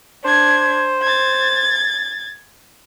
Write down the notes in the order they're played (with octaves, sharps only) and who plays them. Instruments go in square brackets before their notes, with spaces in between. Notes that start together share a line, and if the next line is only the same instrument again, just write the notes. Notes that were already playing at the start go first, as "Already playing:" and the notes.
[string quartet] D4 G#6 [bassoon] C5
[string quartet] G#6 A6